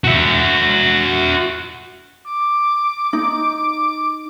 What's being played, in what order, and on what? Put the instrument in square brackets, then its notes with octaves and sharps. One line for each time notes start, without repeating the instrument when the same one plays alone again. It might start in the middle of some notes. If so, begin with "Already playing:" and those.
[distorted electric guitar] F#4 E5
[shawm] D6
[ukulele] D#4